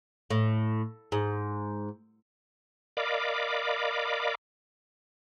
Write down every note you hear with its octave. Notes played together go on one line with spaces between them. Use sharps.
A2
G#2
A#4 D5 D#5 F5 B5 D6